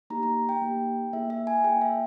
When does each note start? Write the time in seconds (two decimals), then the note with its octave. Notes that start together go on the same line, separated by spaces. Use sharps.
0.10 A#3 D#4 G4 A#5
0.23 A#5
0.49 G5
0.62 A#3 D#4 G4
1.13 A#3 E4 G#4 E5
1.30 E5
1.47 G#5
1.64 A#3 E4 G#4 G5
1.81 E5